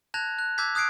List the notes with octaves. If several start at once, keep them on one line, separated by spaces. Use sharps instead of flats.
A5 F#6 G#6 A#6 F7
F#6
A5 D6 E6 G6 G#6 B6
D#6 F#6 G#6 C7 D7